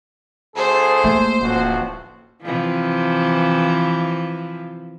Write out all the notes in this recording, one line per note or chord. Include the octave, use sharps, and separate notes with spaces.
D2 G#4 A4 C5
A3 A#3
D1 A1 F2 F#4
C3 E3 F3